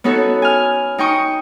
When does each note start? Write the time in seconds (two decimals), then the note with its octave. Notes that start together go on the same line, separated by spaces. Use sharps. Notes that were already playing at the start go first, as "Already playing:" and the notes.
0.04 B3 C#4 D#4 F#4 A4
0.42 G#5 F6
0.98 D#4 G5 C#6 D#6